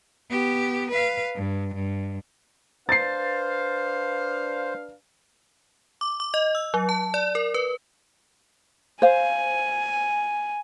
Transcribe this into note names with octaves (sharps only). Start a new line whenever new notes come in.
B3 G4
B4 F5
G2
G2
D4 B4 C5 F5 A6 C7
D6
D6
D#5
E6
F#3
A5
D5
A#4
B4
C5 F5 G#5